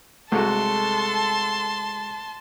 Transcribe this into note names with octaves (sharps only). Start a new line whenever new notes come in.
C2 G#3 A3 F#4 A4 A5 C6